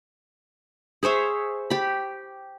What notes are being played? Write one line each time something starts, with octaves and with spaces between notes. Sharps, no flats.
G#4 C5 C#5 E5
G4 B5